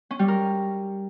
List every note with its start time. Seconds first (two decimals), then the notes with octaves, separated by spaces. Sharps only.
0.11 C#4
0.19 G3
0.28 A#4